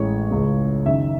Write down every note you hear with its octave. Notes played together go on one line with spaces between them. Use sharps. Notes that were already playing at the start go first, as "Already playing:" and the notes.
Already playing: A1 A2 G#3 C#5
C#2 C#3 G#3
F#1 F#2 D#3 E5